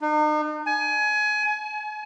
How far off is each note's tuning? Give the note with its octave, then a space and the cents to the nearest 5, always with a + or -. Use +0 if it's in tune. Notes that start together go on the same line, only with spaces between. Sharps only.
D#4 -40
G#5 +25
G#5 +40